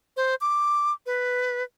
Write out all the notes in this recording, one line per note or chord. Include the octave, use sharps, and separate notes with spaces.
C5
D6
B4